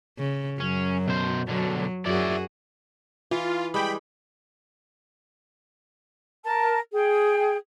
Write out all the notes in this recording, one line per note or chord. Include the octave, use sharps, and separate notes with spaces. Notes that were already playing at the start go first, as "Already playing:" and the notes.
C#3
F#2 F#3 C#4
B2 C5
B2 D3 F#3
F#2 E4 F#4 G#4 D5
E3 F4
G3 G#3 G5 B5
A#4 A5
G#4 G5